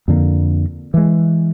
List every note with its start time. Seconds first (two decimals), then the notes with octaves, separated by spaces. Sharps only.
0.08 F2 D3 A#3
0.94 E3 G#3